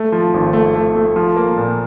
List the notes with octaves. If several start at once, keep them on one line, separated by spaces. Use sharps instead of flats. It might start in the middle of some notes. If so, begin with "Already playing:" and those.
Already playing: A3
F3
G#1
A3
A3
A3
F3
A#3
A#2